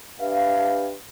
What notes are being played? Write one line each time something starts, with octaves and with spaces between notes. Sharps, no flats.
D4 G4 B4 E5 F5